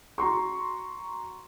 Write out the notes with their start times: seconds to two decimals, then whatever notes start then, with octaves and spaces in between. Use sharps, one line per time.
0.18 F#4 A#5 C6 C#6